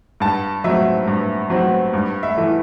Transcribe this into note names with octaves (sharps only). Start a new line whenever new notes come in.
G2 A5
F#3 C4 E5
G2
F#3 C4
G2
E5
E3 A3